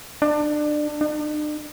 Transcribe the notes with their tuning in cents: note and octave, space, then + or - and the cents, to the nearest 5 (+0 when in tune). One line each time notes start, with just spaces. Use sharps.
D4 +25
D4 +45